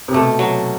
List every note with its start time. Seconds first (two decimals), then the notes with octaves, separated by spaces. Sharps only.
0.08 C3
0.14 B2 A3
0.39 F#3